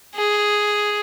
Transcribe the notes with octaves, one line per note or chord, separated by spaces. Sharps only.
G#4